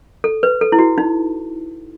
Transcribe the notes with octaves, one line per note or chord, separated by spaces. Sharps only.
A4
B4
A4
E4
F#4
D#4